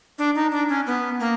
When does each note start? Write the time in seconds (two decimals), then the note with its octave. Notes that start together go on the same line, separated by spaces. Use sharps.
0.18 D4
0.35 D#4
0.52 D4
0.69 C#4
0.86 B3
1.20 A#3